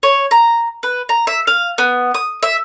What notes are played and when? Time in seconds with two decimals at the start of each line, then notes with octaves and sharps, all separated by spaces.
0.03 C#5
0.31 A#5
0.83 B4
1.09 A#5
1.27 E5
1.47 F5
1.78 B3
2.14 D#6
2.43 E5